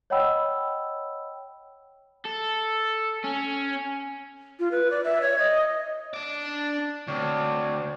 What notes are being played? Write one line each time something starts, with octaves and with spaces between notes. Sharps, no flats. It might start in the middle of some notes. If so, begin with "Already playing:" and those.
C#5 D#5 F#5 G5 B5 E6
A4
C#4
F4
B4
D5
E5
C#5
D#5
D4 D5
D2 C4 C#5 D5